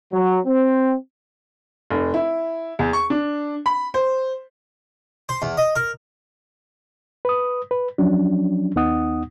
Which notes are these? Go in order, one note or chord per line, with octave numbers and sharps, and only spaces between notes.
F#3
C4
F1
E4
E2
C#6
D4
B5
C5
C5
E2
D#5
A#4
B4 D#6
B4
F3 F#3 C#4 D4
D#2 B3 D#4 F#5 D#6